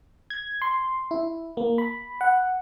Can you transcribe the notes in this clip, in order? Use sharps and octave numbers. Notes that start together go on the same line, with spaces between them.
G#6
C6
E4
A#3
B5
F#5